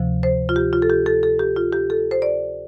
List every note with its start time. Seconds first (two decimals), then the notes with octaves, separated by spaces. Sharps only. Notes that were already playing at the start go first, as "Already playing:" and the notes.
Already playing: D2 C3 F3
0.23 C5
0.49 F4
0.56 G4
0.73 F4
0.82 A4
0.90 G4
1.06 A4
1.23 A4
1.39 G4
1.56 F4
1.73 G4
1.90 A4
2.11 C5
2.22 D5